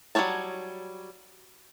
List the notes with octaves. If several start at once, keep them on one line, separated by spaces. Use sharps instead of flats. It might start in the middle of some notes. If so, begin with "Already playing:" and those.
F#3 G3 G#4 C#5 A5